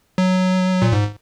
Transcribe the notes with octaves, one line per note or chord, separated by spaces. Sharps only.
F#3
A#2
G#2